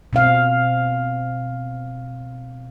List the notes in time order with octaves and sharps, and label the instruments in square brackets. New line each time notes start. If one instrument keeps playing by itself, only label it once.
[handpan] B2 C4 F5